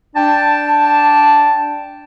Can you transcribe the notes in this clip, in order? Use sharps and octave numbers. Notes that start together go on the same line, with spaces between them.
D4 G5 A5